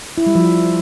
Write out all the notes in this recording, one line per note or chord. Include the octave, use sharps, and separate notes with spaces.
E4
G3
F3